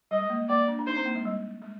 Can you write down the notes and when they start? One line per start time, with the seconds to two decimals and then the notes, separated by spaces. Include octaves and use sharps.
0.11 G3 D#5
0.21 G#3
0.30 A#3
0.49 A#3 D5
0.68 D4
0.79 D4
0.87 D#4 C5
0.96 C4
1.05 A#3
1.15 G#3
1.25 G3
1.62 G#3